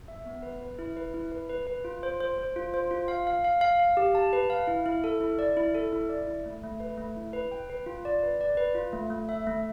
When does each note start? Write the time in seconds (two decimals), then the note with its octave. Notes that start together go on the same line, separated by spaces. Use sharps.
0.08 E5
0.26 B3
0.43 B4
0.61 B4
0.79 E4
0.97 B4
1.14 E4
1.32 B4
1.49 B4
1.67 B4
1.85 F4
2.03 C5
2.20 C5
2.38 C5
2.56 F4
2.74 C5
2.91 F4
3.08 F5
3.27 F5
3.45 F5
3.61 F5
3.80 F5
3.97 G4
4.15 A5
4.33 B4
4.50 F5
4.68 E4
4.86 E4
5.04 A4
5.21 E4
5.39 D5
5.57 E4
5.75 A4
5.93 E4
6.09 D5
6.28 E4
6.46 A3
6.63 A3
6.80 B4
6.98 A3
7.17 E4
7.33 B4
7.52 G5
7.70 B4
7.86 F4
8.05 D5
8.23 B4
8.41 D5
8.57 B4
8.75 F4
8.93 A3
9.10 A3
9.29 E5
9.47 A3